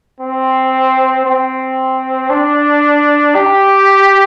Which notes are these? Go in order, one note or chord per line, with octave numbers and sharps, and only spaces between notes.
C4
C4
D4
G4